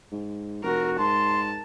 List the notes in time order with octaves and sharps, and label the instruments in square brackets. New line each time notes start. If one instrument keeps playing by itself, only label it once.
[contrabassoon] G#2
[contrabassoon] F1 [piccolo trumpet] F#4 [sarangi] A#4
[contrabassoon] G#2 [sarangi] A5 [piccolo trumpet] C6